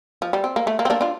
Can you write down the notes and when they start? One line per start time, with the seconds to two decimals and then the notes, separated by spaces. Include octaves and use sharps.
0.22 F3
0.33 G3
0.44 C4
0.56 A#3
0.67 A3
0.79 A#3
0.85 C4
0.90 A#3 D4
1.01 D4 F4